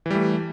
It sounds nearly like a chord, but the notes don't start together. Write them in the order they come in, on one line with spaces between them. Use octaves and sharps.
E3 G3 A3